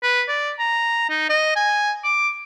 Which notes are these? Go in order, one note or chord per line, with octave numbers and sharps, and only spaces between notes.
B4
D5
A#5
D#4
D#5
G#5
D6